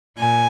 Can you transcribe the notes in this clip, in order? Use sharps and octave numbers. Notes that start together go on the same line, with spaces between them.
A#2 G#5